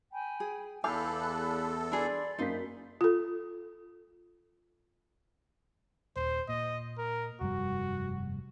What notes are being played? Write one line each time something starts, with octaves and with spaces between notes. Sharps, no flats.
G5 G#5 B5
G#4
E2 A4 F5 G#5 B5 D6 F#6 G6
D4 G#4 D5 B5 C6
F#2 A#3 D#4 C5 B6
F4 A4
D#1 C5
A#2 D#5
A#4
F1 G2 G3 F#4